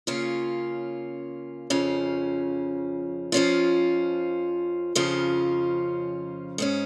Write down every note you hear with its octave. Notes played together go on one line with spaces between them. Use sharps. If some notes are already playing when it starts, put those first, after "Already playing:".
C#3 A#3 C#4 F4
F2 C#3 F3 C#4
F2 F3 C#4 F4
F2 C#3 F3 C#4 F4
G#2 G#3 C#4